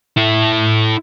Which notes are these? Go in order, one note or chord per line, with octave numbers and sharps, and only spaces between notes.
E4 A4